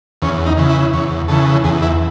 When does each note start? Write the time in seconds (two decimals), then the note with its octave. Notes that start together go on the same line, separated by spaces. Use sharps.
0.22 E2 C#4
0.46 D#4
0.57 C#3 E3
0.69 E4
0.93 E2 C#5
1.28 C#3 E3 A4
1.64 E2 G#4
1.82 E4